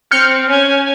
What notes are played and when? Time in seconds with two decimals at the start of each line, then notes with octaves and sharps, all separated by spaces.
0.11 C4 F6 G6 C#7
0.49 C#4 G#5